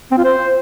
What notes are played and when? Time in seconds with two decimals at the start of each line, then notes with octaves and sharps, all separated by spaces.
0.11 C4
0.18 F4
0.24 C5